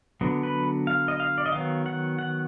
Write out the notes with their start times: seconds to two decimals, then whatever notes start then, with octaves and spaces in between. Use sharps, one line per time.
0.21 D3 F#3 B3
0.43 B4
0.87 F5
1.08 D#5
1.20 F5
1.38 D5
1.46 D#5
1.52 D#3 F#3 B3 F5
1.86 F#5
2.19 F#5